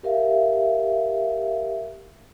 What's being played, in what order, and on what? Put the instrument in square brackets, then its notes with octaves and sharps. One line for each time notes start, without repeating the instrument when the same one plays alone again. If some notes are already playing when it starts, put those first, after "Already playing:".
[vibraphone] G4 A#4 E5 F5